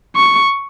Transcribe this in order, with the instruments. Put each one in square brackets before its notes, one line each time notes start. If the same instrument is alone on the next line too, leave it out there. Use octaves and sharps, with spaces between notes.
[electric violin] C#6